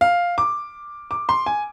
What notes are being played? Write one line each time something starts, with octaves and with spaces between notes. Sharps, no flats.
F5
D6
D6
C6
G#5